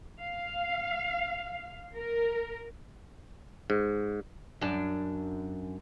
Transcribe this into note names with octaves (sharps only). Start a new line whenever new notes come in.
F5
A#4
G#2
F#2 D4